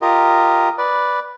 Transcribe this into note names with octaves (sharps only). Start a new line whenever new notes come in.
F4 G4 A#4 D#5
B4 D5